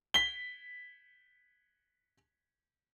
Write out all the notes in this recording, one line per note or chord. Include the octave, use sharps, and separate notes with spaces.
B6 G7